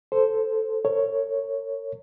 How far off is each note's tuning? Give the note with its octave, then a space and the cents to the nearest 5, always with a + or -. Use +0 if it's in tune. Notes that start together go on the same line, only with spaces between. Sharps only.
A4 +0 C5 +0
A#4 -45 C#5 +0